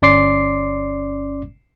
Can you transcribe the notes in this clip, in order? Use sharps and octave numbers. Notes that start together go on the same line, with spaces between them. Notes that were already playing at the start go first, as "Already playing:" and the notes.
G1 C#4 D5 C6 D6 C7